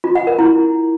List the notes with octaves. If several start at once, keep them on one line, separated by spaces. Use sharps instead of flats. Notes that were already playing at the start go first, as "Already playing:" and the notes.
F4
F#5
A#4
E4